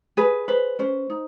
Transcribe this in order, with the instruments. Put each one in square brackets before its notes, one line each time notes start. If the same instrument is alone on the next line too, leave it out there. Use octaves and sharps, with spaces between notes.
[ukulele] G#4 B4
B4 C5
C#4 C5
D#4